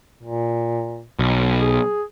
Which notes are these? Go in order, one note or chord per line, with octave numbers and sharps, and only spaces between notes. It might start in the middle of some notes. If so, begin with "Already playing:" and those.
A#2
B1
G#4